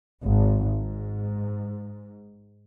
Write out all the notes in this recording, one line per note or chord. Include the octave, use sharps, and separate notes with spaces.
G#1
G#2